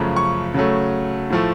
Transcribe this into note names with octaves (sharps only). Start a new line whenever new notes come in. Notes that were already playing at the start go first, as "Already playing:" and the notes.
Already playing: F#2 C#3 F3 A3
C#6
C#3 F#3 A3
A2 F3 A3